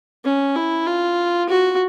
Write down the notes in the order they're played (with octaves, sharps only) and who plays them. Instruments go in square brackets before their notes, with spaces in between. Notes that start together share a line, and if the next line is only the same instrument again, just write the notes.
[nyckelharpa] C#4
E4
F4
F#4